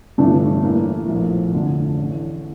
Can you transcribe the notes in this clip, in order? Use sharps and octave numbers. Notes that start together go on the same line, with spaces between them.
G1 G2 E3 A3 D4
A2 E3 A#3 E4
A#1 A2 F3
F2 D3 A3
A1 A2 E3